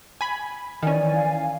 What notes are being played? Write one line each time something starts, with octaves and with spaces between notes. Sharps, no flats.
G#5 B5
D#3 E3 C#4 D5 G#5
F5